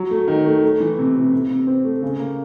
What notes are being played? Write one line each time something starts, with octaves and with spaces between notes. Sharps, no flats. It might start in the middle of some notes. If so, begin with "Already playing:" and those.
Already playing: F#3
A3
D#3
A3
A3
E3
C3
C3
C3
C3
C4
A3
C#3
A#3